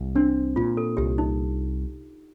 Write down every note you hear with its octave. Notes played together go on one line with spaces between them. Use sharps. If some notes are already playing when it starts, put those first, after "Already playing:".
Already playing: C2
C4 D4
A#2 F4
A4
C2 G4
D#4